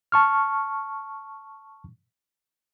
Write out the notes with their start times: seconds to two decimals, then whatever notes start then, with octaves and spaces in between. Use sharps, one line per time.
0.12 A5 C#6 F6